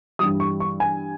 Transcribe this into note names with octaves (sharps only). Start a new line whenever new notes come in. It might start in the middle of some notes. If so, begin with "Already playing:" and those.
G2 E3 G3 D#6
C#6
C#6
G#5